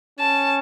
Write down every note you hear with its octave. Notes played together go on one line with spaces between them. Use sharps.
C#4 A5